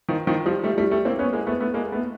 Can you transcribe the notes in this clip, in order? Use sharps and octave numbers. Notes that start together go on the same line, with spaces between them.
D#3 F3
D#3 F3
F3 G3
G3 A3
G3 A3
G3 A3
A#3 C4
B3 C#4
G#3 A#3
A3 B3
A3 B3
G#3 A#3
A3 B3